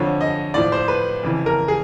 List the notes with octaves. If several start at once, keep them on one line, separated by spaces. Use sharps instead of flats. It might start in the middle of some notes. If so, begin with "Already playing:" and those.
Already playing: F2 D3 F3 C#5
D#5
A2 F3 D5
C5
B4
F2 C#3 E3
A#4
G#4